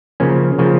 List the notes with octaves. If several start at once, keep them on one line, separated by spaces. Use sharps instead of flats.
C#3 F3 A#3 C#4
C#3 F3 A#3